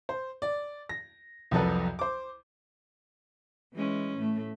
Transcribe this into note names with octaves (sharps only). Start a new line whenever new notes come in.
C5
D5
A#6
C2 F2 F#3 A4 B4
C5 D6
E3 G#3 C#4
A2 A3